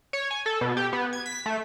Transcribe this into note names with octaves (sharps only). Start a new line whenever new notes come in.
C#5
G#5
A4
B2
G4
B3
G#6
B6
A3